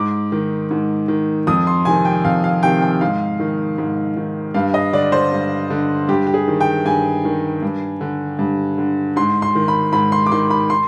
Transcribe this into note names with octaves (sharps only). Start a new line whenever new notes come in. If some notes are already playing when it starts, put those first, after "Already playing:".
Already playing: G#2 D6
D#3
G#2
D#3
F2 D#6
C6
C3 D#3 G#5
G5
F2 F5
F5
C3 D#3 G5
G5
G#2 F5
D#3
G#2
D#3
G2 F5
D#5
D3 D5
C5
G2
D3
G2 G4
G4
G#4
D#3
G5
G2 G#5
D#3
G2
D3
G2
D3
G#2 C6
C6
D#3
B5
G#2 B5
C6
D6
D#3 C6
B5
C6